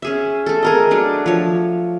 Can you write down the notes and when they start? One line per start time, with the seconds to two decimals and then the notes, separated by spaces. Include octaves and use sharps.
0.02 C#4 G#4 E5
0.46 A3 A4
0.63 G#4 A#4 D#5
0.91 F#3 A3 D4
1.26 F3 C#5